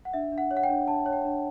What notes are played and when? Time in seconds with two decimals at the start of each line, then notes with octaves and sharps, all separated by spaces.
0.05 F#5
0.13 D4 E5
0.32 D4
0.38 F#5
0.51 C#5
0.57 F#5
0.63 G5
0.69 D4
0.88 D4 A5
1.06 C#5
1.13 G5
1.25 D4